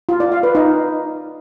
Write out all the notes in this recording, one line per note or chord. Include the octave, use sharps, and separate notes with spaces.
F4
D5
F5
B4
D#4